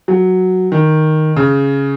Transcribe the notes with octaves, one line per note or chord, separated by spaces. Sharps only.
F#3
D#3
C#3